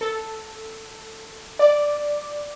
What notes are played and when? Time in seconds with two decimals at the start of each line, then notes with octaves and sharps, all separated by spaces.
0.01 A4
1.59 D5